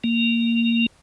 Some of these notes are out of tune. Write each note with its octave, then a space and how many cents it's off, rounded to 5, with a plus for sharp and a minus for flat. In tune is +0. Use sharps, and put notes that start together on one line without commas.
A#3 -10